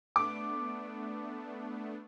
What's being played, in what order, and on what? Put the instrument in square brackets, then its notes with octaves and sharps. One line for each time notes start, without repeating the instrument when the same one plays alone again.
[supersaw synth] A3 B3 D4 [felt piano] D6